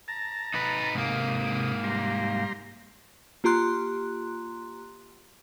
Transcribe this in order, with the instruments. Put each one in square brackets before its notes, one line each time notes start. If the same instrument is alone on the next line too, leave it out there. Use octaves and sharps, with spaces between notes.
[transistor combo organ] A5 A#5
[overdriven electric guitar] D#4 B4
[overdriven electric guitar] G#2 A#3 [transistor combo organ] C3 D#6
[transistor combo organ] G3 A#5 C6
[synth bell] A#3 F4 G4 A#5 C6 F#6